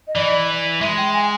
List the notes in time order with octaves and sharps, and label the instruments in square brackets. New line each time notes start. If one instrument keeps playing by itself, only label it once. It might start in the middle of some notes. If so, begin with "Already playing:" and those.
[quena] D#5
[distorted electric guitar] E3 [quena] D5
[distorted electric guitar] G#3 [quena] E5
[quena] G5
G#5